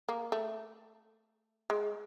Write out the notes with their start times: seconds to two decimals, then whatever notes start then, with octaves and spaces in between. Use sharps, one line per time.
0.09 A#3
0.32 A3
1.70 G#3